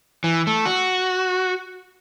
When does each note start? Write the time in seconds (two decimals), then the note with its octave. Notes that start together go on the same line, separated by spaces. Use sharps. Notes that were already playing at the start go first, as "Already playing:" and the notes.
0.24 E3
0.47 A3
0.66 F#4